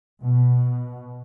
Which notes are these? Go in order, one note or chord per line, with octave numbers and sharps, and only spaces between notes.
B2